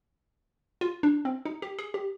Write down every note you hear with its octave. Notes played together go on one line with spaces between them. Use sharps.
F4
D4
C4
D#4
G4
G#4
G4